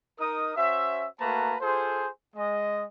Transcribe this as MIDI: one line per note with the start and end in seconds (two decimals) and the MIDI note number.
0.19 0.54 63
0.19 0.54 70
0.19 0.54 87
0.56 1.06 61
0.56 1.06 66
0.56 1.06 72
0.56 1.06 76
1.20 1.55 57
1.20 1.55 58
1.20 1.55 66
1.20 1.55 71
1.20 1.55 81
1.20 1.55 82
1.61 2.09 65
1.61 2.09 68
1.61 2.09 69
1.61 2.09 72
2.36 2.84 56
2.36 2.84 75